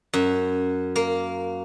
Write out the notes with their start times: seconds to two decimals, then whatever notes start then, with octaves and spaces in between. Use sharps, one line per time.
0.13 F#2
0.96 A#3